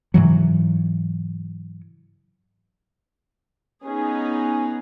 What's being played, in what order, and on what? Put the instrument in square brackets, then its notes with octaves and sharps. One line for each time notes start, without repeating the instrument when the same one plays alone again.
[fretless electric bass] G#2 C#3 E3 F#3
[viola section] B3 D#4 G#4 [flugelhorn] C#4